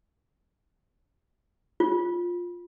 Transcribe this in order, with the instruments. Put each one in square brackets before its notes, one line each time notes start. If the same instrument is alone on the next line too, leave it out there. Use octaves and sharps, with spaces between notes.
[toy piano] F4